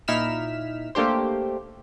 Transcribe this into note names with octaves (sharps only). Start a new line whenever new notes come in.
A#2 D#4 E4 F6 B6 E7
A3 A#3 D4 G4 C5